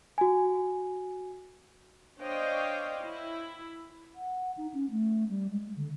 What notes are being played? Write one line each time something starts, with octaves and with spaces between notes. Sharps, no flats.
F#4 G#5
D4 C5 C#5 D#5 F5 G5
E4
F#5
D#4
C#4
A3
G3
G#3
D3